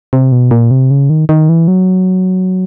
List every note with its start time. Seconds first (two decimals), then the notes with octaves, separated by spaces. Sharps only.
0.13 C3
0.32 B2
0.51 A#2
0.71 C3
0.91 C#3
1.10 D#3
1.29 D#3
1.49 E3
1.68 F#3